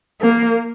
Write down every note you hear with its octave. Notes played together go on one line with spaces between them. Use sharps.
A#3